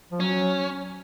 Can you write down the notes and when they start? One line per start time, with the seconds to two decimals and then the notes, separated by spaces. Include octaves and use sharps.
0.12 F3
0.20 F#3 C#4